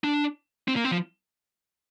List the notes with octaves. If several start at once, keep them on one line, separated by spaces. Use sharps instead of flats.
D4
C4
A#3
C4
F3